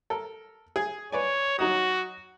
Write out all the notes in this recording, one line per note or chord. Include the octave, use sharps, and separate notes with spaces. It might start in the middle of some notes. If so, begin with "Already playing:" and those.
A4 A#4
G#4 G#5
B4 C#5 D5 G#5
F#3 D#4 F#4 D#6